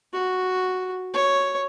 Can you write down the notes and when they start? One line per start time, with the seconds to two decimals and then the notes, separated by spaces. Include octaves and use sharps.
0.13 F#4
1.14 C#5